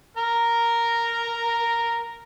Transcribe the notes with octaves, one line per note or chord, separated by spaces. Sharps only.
A#4 A#5